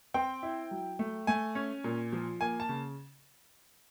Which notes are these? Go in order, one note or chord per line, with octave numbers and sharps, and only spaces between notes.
C4 G5
E4
F#3
A3
A3 G#5
C#4
A#2
F3
A#3 G#5
A5
C#3